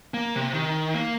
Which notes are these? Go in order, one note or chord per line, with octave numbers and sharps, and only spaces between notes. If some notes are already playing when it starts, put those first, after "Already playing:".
A#3
C3
D#3
A#3